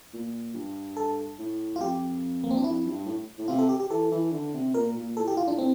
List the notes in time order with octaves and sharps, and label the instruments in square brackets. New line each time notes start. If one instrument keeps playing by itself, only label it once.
[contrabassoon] A#2
G2
[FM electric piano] A4
[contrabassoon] A2
[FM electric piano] F4
[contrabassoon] F2 [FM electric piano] G4
[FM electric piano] A#3
C4
D4
[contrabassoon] F2 [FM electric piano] E4
[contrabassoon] G2
A2
A2
[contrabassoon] C3 [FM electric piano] F4
[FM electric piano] A4
G4
G4
[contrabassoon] E3 [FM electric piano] A4
[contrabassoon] E3
D3
C3
[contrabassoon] A#2 [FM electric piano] A#4
[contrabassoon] A#2
[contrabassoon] A2 [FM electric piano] A4
[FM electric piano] G4
F4
D4
C4